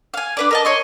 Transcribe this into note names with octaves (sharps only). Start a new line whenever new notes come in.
F5 G#5
D4 B4 D5
A#4 D#5 A5
C#5 D#5 C6